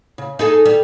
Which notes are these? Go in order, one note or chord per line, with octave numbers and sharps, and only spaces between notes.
C#3
D#4 G#4 A4
G3